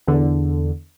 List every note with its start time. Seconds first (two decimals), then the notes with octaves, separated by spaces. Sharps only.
0.07 E2 D3